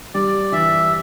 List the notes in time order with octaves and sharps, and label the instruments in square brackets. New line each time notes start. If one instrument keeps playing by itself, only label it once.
[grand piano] G3 [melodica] D5
[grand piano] E3 [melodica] E5